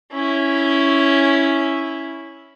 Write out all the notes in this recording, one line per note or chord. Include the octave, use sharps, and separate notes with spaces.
C#4 E4